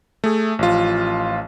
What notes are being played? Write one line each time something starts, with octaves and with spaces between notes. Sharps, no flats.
A3 G#4
A1 F3 F4